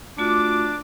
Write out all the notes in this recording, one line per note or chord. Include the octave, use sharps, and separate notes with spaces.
A3 D4 F4 F#4 D6